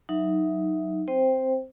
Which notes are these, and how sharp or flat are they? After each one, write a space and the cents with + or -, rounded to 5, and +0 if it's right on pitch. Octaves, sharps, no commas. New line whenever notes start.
F#3 +0 D#4 +0 E5 +0
C4 +0 C5 +0 G5 +0